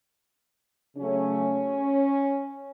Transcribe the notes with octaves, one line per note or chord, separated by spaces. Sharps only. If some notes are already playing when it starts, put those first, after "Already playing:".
C#3 F#3 A3 C#4